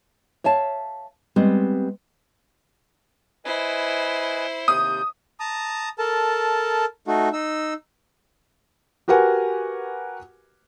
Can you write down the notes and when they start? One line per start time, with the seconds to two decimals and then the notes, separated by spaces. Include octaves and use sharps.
0.44 C#5 E5 F5 A5
1.36 G3 G#3 B3 C4
3.45 E4 B4 C5 D#5 G#5
4.68 D#2 C3 D#6 G6
5.40 A5 A#5 D#6
5.99 A4 A#4 A5
7.07 A3 D#4 F#4
7.33 D#4 E6
9.08 F#4 G4 A#4 B4 F#5 G#5